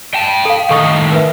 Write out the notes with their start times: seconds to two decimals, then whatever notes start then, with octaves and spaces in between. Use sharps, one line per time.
0.14 G5 A5
0.45 A4 F5
0.70 A2 D#3 A4 C#6 D#6
1.12 A#4 B4 E5